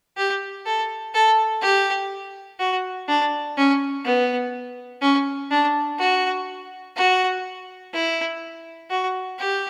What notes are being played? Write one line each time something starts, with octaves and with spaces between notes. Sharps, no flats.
G4
A4
A4
G4
F#4
D4
C#4
B3
C#4
D4
F#4
F#4
E4
F#4
G4